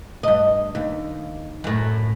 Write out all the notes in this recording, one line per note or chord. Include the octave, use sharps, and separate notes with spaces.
G2 D#5
D#2
F#2 A2